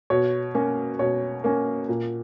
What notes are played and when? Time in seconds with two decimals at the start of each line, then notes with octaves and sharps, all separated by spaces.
0.10 B2 C#5
0.55 A#3 C#4
0.99 B2 C#5
1.44 A#3 C#4
1.89 A#2